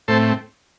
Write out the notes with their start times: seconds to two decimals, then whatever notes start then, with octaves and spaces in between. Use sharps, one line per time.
0.08 A2 A3 C4 A4 C5